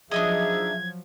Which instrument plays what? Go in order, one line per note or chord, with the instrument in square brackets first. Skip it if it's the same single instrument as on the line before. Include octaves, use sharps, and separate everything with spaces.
[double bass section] F3 F#3 [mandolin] D4 D#4 D#5 [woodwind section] G#4 E5 [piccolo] G#6